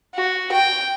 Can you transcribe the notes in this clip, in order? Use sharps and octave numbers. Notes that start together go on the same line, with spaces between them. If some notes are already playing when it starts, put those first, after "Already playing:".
F#4
G5